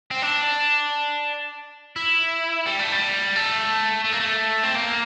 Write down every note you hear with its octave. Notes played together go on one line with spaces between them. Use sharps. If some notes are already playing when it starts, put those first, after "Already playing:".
C4
D4
E4
G3
A3
G3
A3
A3
A#3
A3
C4
A#3